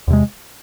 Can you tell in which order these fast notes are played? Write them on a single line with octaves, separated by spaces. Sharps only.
E2 C3 G#3